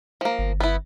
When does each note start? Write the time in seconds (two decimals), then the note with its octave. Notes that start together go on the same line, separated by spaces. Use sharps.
0.21 F3 A#3
0.39 G1
0.60 B3 E4